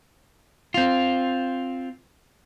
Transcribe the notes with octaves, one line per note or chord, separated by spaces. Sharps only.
C4 F4